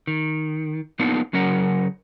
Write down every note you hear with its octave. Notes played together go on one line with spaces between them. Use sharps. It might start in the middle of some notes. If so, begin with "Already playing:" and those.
D#3
A#3 B3 D4 D#4 F4
C#3 F#3 C#4 A#4 F#5